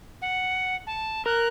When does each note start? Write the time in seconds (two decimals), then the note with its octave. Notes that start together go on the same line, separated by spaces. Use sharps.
0.22 F#5
0.87 A5
1.26 A#4 F#6